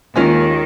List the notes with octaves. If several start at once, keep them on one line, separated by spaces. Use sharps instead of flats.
D#2 D#3 G#3 C#4 F4